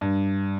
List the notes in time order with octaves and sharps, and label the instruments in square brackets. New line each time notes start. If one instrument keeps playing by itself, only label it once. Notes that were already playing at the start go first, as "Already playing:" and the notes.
[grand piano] G2